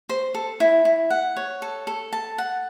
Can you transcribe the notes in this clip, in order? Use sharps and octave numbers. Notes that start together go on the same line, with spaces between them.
C5
A4
E4
E4
F#5
C#5
A4
A4
A5
F#5